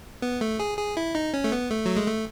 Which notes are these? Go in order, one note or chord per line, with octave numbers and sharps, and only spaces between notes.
B3
A3
G#4
G#4
E4
D#4
C#4
A3
B3
A3
F#3
G#3
A3